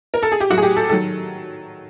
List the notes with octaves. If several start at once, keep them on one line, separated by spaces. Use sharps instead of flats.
A#4
A4
G#4
G4
A2 F#3 F#4
G#4
G4
A4
D#3 F#3 A4